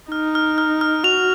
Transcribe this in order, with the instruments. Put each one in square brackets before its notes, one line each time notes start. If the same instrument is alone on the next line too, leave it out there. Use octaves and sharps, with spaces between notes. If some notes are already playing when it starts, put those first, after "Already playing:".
[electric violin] D#4 [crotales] F6
[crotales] F6
F6
F6
[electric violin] F#4 [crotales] F7